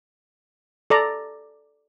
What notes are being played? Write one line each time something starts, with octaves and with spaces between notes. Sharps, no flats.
A4 D5 A#5